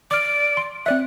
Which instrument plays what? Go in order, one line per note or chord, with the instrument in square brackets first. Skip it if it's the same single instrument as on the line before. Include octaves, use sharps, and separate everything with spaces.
[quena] D5 [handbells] D6 F6
[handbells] C6
[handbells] C4 D5 E5 [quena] F#6